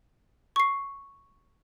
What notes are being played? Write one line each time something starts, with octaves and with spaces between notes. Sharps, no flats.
C#6 C7